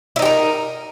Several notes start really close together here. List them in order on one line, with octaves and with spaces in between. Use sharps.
E4 D#4 G4 A#4